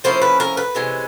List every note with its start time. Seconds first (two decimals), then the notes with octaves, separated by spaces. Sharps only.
0.04 F3 A#3 C#4 E4 C5
0.22 B4
0.40 A#4
0.57 B4
0.75 C3 E3 G#3 C#4